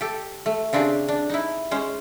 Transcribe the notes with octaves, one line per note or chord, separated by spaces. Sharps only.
G4 A4
A3
C#3 C4 D4 G4 G#4
D4
D#4 E4
G#3 C#4 C5